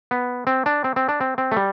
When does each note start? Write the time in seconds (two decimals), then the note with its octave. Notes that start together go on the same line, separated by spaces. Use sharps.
0.11 B3
0.47 C4
0.66 D4
0.84 C4
0.96 C4
1.09 D4
1.21 C4
1.38 C4
1.52 A3
1.56 G3